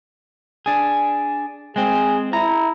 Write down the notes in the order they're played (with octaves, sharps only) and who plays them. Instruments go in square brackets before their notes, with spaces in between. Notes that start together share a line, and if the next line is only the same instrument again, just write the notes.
[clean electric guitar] D4 G#4
[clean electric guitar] G#3 C4 [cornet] G#4
[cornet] E4 [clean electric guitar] A#5